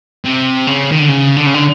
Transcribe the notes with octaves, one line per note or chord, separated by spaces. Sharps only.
C3
C#3
D#3
D3
C#3
D3
C#3
D3